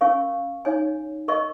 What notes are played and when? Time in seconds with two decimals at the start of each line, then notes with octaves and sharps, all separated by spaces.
0.01 C#4 A#4 F5 G#5 C#6
0.65 D#4 C#5 G#5
1.28 A#4 D#5 C#6